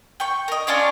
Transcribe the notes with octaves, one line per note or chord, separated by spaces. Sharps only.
G5 C#6
A#4 D#5
C#4 D4 F4 C#5